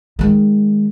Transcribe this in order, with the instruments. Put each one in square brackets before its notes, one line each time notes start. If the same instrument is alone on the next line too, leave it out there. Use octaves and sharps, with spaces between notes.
[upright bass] D#3 G#3